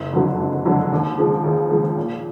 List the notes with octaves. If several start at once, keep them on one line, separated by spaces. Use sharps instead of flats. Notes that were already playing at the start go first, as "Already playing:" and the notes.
Already playing: F#1
F2 D3 F#3
F#1
F2 D3 F#3
D#2
C#3 F3 G#3
D#2
C#3 F3 G#3
A#2